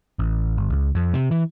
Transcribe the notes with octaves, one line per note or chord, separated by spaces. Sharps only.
A1
G1
C#2
F2
C3
E3